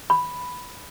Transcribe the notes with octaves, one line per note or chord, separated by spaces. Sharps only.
B5